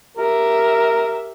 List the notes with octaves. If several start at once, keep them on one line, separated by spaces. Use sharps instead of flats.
G4 A#4 E5